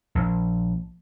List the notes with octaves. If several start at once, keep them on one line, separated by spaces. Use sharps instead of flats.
A#1